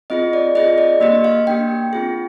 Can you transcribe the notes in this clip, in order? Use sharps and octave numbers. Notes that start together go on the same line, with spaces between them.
C4 F4 G#4 D#5
D5
C4 F4 G#4 D#5
D5
A#3 D4 G4 D#5
F5
A#3 D4 G4 G5
C4 F4 G#4